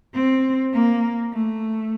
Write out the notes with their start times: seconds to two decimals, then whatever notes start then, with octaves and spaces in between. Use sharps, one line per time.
0.14 C4
0.73 A#3
1.33 A3